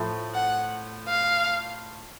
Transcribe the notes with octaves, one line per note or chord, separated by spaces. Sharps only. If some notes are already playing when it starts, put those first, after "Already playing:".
Already playing: A2 F3 A3
F#5
F5